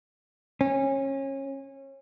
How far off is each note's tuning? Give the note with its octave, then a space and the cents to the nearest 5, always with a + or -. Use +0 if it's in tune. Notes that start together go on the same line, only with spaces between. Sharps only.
C#4 -25